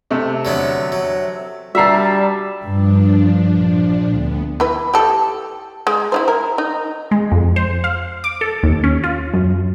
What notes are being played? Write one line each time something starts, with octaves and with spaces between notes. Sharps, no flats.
C3 A3
D3 F#3 B3
F#3
G3 D4 F#4 E5 A5 A#5 C7
G2 F3 D4
A#1
D2 B3
E3 B4
G4 A4
G#3
E4 F4 C5
A#4
D#4
G#3
F2
C5
F5
D6
A4
D#2
C#4
F4
F#2